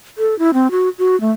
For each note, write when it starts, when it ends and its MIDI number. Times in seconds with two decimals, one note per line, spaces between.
0.18 0.37 69
0.39 0.51 64
0.54 0.71 60
0.71 0.89 66
0.99 1.19 66
1.21 1.31 57